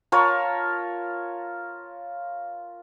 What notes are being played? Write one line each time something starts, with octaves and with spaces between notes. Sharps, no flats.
F4 A#4 C#5 A5